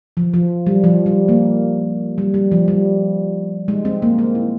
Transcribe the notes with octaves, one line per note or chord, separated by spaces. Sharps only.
F3
F3
G3
F3
G3
A#3
G3
G3
F3
G3
G#3
C4
A#3
C4
E4